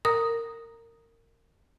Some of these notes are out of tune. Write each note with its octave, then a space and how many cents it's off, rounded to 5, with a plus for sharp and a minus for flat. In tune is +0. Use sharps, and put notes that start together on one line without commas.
A#4 -25 A#5 +0 D#6 +0